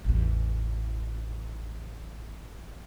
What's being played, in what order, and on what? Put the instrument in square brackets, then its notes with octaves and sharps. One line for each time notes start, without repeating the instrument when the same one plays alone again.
[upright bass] A1 E2